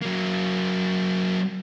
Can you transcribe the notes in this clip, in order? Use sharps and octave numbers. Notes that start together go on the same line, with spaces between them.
F#3 A#3